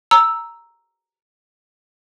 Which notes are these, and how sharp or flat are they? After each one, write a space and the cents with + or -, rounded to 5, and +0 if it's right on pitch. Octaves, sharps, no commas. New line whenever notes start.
A#5 +0 E6 +0